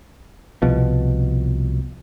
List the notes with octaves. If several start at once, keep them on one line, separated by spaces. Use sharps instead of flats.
C2 B2 F3